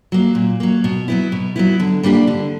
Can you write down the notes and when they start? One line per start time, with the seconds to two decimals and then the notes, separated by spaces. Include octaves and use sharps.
0.12 F#3 A#3
0.35 A#2
0.60 F#3 A#3
0.84 B2
1.08 F#3 B3 E4
1.32 B2
1.56 F#3 B3 E4
1.80 D3
2.03 G3 A#3 D4 G4
2.27 D3